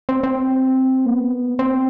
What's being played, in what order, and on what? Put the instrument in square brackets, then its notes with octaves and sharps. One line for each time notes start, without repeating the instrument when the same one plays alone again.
[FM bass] C4
C4
A#3
B3
C4